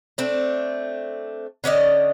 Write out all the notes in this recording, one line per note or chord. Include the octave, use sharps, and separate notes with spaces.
A3 C4 D4
D3 C#4 D5 D#5